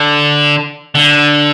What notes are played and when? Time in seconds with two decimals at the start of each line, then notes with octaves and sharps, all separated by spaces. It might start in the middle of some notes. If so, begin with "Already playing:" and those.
Already playing: D3
0.95 D3